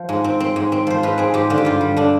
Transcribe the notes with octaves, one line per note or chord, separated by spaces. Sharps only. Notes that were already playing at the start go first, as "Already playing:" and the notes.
Already playing: F3
G#2
C4
C4
G#2
C4
F3 C5
G#2 B4
C4 G#4
G#2 G4
D3 F4
G4
G2 F4
G3
D3 D4